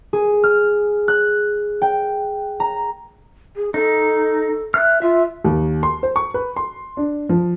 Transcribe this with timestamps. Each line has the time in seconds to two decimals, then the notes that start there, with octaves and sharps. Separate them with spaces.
0.13 G#4
0.43 F6
1.08 F#6
1.82 G5
2.60 A#5
3.56 G#4
3.74 D#4 A4
4.74 E5 F6 F#6
5.02 F4 E5
5.44 D#2
5.83 C6
6.03 C5
6.16 C#6
6.34 B4
6.56 C6
6.97 D4
7.29 F3